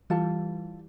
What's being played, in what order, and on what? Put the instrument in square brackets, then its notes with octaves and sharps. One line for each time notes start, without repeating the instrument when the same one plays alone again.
[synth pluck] E3 G3 [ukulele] F4 A4 A5